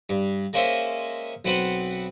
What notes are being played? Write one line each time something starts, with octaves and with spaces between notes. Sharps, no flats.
G2
G#3 A#3 C#4 C5 D#5 E5
B1 B3 C4 B4 C5 F#5